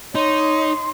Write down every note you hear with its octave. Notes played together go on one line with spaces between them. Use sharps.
D#4 C#5 C6